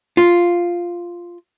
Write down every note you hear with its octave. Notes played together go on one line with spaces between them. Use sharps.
F4